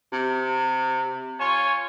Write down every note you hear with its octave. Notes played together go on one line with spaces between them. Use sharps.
C3
F4 C#5 G#5